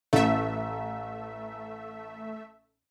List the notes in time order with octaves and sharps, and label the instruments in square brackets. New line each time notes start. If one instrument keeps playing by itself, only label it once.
[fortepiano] A1 [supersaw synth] A3 E5